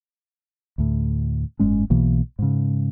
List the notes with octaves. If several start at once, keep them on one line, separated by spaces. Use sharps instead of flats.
D2 A2
F#1 G#2 G#3 C#4
B1 B2 E3 A#3
G#2 C#3